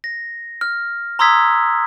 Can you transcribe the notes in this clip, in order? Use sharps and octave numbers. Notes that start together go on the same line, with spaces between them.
A#6
F6
A#5 C6 D#6 E6 G#6 B6